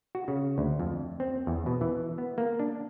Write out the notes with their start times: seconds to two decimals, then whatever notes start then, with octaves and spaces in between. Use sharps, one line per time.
0.15 F#4
0.28 C#3
0.58 D2
0.80 F2
1.20 C4
1.47 E2
1.66 B2
1.81 E3
2.18 B3
2.38 A#3
2.59 D4